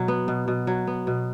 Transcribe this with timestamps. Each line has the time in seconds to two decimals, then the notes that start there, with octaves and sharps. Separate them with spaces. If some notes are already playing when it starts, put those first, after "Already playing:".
Already playing: B2 F#3
0.08 B3
0.28 B2
0.48 B2
0.67 F#3
0.87 B3
1.07 B2